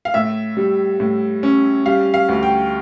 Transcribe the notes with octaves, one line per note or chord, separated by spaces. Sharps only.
F5
A2 E5
G3
A2
C#4
G3 F5
F5
D2
G5